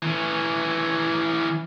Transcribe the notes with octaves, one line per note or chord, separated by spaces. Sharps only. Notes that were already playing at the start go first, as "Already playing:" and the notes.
E3 C#4